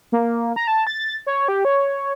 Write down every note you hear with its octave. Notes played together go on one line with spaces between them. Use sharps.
A#3
A#5
A5
A6
C#5
G4
C#5